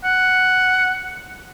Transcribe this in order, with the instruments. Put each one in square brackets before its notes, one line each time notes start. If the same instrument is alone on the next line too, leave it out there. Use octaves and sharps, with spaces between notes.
[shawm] F#5